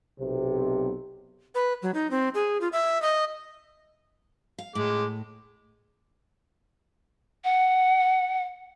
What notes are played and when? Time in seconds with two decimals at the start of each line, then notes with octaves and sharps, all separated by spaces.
0.20 B1 C3
1.55 B4
1.82 F#3
1.94 D#4
2.11 C4
2.35 G#4
2.61 F4
2.72 E5
3.02 D#5
4.58 F5
4.75 A2 G#3 D6
7.44 F#5